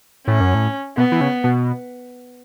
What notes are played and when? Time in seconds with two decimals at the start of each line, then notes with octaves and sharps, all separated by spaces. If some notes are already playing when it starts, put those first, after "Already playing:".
0.27 A2 C#4
0.40 F#2
0.54 A2
0.97 B2 B3
1.12 E3
1.21 C#3
1.44 B2